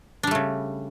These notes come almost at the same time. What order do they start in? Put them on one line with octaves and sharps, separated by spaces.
D4 G3 A3 C#3